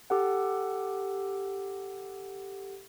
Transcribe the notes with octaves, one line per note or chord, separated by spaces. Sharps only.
G4 A4 F#5